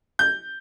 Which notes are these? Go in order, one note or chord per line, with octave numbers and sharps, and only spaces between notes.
G6